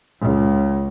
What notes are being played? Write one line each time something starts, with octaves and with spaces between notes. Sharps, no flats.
C#2